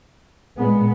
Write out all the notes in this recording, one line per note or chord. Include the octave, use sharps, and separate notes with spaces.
A#2 G#3 B3